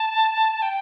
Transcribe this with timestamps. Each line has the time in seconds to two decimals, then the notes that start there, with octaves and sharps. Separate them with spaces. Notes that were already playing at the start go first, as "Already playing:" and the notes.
Already playing: A5
0.62 G5